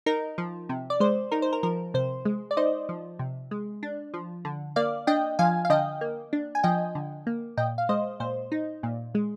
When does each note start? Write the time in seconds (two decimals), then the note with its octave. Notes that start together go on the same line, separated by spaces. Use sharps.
0.06 D#4 A#4
0.38 F3
0.69 C3
0.90 D5
1.00 G#3 C5
1.32 D#4 A#4
1.42 C5
1.53 A#4
1.63 F3 A#4
1.94 C3 C5
2.25 G#3
2.51 D5
2.57 D#4 C5 D#5
2.89 F3
3.19 C3
3.51 G#3
3.83 D4
4.14 F3
4.45 D3
4.76 A#3 D5 F5
5.07 D4 D#5 G5
5.39 F3 F5 G#5
5.65 F5
5.70 D3 D#5 G5
6.01 A#3
6.33 D4
6.55 G#5
6.63 F3 D#5 G5
6.95 D3
7.27 A#3
7.57 A#2 D#5 G5
7.78 F5
7.89 G#3 C5 D#5
8.20 A#2 C5
8.52 D#4
8.83 A#2
9.15 G#3